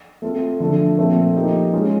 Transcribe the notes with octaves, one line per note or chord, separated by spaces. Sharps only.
A3 C4 F4 A4
D3 F3 A3
A#2 F3 A3 C4
F3 A#3 D#4 G4
G#3 C#4 F4